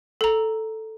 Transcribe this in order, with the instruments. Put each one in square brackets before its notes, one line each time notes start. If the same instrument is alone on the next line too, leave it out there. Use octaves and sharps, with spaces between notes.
[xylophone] A4 A#5